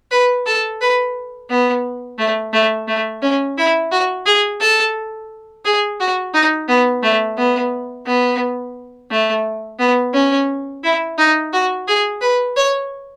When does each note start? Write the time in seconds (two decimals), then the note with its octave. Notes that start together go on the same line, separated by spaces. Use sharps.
0.11 B4
0.46 A4
0.81 B4
1.50 B3
2.19 A3
2.53 A3
2.88 A3
3.22 C#4
3.58 E4
3.91 F#4
4.26 G#4
4.61 A4
5.65 G#4
6.00 F#4
6.34 D#4
6.68 B3
7.03 A3
7.38 B3
8.06 B3
9.11 A3
9.79 B3
10.14 C#4
10.83 E4
11.18 D#4
11.53 F#4
11.87 G#4
12.21 B4
12.56 C#5